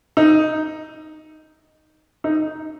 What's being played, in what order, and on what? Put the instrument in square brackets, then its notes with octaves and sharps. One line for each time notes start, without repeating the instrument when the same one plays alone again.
[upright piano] D#4
D#4